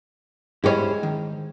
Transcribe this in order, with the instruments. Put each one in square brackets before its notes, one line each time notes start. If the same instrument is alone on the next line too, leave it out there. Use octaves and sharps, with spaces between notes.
[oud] G#3 C#4 [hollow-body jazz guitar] E4 G4 G#4
[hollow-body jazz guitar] D#3